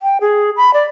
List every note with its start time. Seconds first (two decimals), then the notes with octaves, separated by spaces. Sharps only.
0.02 G5
0.21 G#4
0.57 B5
0.74 D5